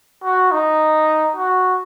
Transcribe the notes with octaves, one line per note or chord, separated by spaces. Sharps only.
F#4
D#4
F#4